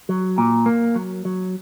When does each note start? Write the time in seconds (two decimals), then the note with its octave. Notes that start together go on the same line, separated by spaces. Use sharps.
0.09 F#3
0.38 A#2
0.66 A#3
0.95 F#3
1.25 F#3